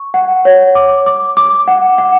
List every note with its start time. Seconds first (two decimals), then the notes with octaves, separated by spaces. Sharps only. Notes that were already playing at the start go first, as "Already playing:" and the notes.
Already playing: C#6
0.14 F#5
0.45 C#5
0.75 D6
1.06 D6
1.37 D6
1.68 F#5
1.98 F#5